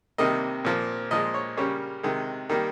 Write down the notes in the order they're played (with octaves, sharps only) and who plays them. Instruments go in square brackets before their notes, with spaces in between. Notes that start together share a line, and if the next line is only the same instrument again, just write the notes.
[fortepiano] C3 D#3 G3 A#3 D#5
A#2 F3 A#3
A#2 F3 G#3 D#5
C#5
C#3 G3 A#3 C#5
C3 D#3 G#3
D#3 G3 A#3